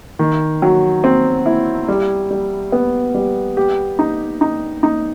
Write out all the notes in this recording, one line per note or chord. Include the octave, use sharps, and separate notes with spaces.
D#3
F#3
C4
E4
G3
G3
B3
G3
G4
D#4
D#4
D#4